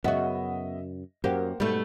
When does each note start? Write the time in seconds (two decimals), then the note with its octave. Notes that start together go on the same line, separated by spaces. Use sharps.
0.04 F#2 C#3 B3 F#4 D#5 E5
1.24 F#2 A#3 G4 C5 F#5
1.60 G#2 B2 G3 A3